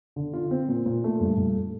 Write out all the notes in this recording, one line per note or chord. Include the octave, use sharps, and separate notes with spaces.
D3
F4
C4
A#2
A#2
A3
G2
G2
A3